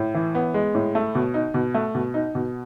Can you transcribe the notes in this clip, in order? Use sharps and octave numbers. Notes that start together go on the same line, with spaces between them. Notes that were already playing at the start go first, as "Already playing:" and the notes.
Already playing: A2
E3
B3
G#3
A2
A3
B2
D#4
B2
A3
B2
D#4
B2